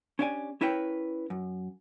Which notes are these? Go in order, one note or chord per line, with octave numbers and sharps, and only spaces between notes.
C#4 D4 E4 G4 D5 G#5
C#4 E4 A#4 B4 C#5 G5
F#2